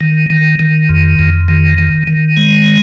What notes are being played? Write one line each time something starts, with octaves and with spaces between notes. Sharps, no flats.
D#3
D#3
D#3
F2
F2
D#3
D#3
D#3
G#3